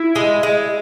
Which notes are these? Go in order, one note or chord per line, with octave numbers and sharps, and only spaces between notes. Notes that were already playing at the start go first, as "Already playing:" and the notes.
Already playing: E4
G#3
G#3